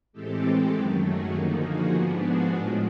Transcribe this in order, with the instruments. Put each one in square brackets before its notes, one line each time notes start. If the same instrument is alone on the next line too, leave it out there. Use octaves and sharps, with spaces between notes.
[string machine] A2 E3 G#3 C4 G4 A4
F#2 D#3 F#3 A3 F#4 G#4
F#4 G#4
D3 F3 A#3 D#4 G4
F#4 G#4
G#2 F3 G#3 B3 D4 G4
F#4 G#4
A2 F3 G#3 G4 A4